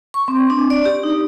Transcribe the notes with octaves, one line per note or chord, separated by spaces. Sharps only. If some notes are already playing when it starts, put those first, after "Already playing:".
C#6
C4
D4
D5
G4
D#4